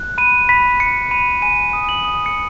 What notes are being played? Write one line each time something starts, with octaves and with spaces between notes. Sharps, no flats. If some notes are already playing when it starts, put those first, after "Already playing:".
Already playing: F#6
B5 D#7
B5 B6
B5 C#7
B5 D#7
G#5 D#7
D#6
F#7
D#6
C#7